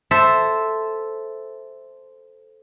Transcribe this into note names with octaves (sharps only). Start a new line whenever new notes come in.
A4 C5 E5